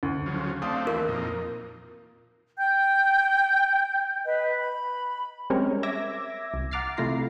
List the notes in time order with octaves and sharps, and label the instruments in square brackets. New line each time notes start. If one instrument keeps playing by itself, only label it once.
[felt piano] D2
[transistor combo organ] C#3 F3 F#3
[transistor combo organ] A3 C4 D4 [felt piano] F5 D#6
[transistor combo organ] D#2 E3 [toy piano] A#4
[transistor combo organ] F2 A#2 D#4
[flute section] G5 G6
B4 D#5
B5
[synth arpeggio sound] G3 G#3 C4 C#4 A#4 C#5
E5 D6 E6 G#6 A#6
C2
F#5 A#5 D6 F6 A6 C7
C3 A3 E4 F4 A#5 C7